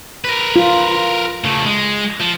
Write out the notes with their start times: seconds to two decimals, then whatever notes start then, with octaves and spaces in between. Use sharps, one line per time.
0.25 A#4 B4
0.56 F4
1.44 C#3 A3
1.66 G#3
2.20 F3